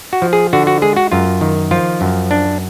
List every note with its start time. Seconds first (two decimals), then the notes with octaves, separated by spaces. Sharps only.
0.13 F#4
0.22 F3
0.33 G#4
0.53 D3 F#4
0.67 F#4
0.82 G#3 G#4
0.96 F#4
1.12 F#2 F4
1.41 D#3
1.71 F3 F4
2.01 F#2
2.31 D4